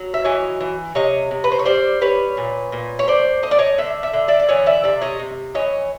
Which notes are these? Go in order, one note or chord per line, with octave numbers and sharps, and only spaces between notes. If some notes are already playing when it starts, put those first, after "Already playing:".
Already playing: F#3
E5
E3 C#5 D#5
E3
C3 C#5 D#5
C3
B4
C5
C#5
G3 C5 D5
G3 B4 C#5
A#2
A#2
C#5
A3 C5 D5
A3 D#5
D5
C#5 D#5
D3 E5
E5
D3
D5 E5
D5
E3 C#5 D#5
D5 E5
C3 D5 E5
C#5 D#5
C3
E3 C#5 D#5